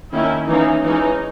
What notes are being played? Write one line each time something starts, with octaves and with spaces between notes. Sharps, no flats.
D#3 A#3 C#4 E4
E3 A#3 C#4 D#4
E3 G#3 C#4 D#4